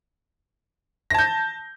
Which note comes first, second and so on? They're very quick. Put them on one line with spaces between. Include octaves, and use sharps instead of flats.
A#6 A5 G6